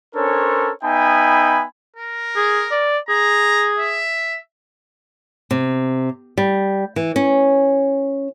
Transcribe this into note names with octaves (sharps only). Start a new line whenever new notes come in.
C#4 D4 A4 A#4 C5 C#5
B3 D#4 E5 G5 G#5 B5
A#4
G#4
D5
G#4 A#5
E5
C3
G3
E3
C#4